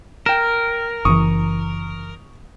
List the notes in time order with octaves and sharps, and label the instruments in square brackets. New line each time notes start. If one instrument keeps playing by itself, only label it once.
[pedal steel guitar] A#4 [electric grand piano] G5 E7
[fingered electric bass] F#1 E3 [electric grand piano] C#6 D#6